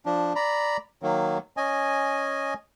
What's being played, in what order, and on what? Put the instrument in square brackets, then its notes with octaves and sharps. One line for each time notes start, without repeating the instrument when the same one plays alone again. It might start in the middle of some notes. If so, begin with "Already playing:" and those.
[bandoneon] F3 D4
D5 A#5 B5
D#3 F#3 A#3
C#4 D#5 G#5